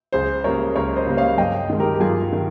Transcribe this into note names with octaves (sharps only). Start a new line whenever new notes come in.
C#2 G#4 C5
C#3 G3 A#3 A#4 C#5
C#2 A#4 C#5
C5 D#5
C#3 G3 A#3
C#5 F5
G2 D#5 G5
D#3 G#3
G4 A#4
G4
G2 F4 G#4
D#3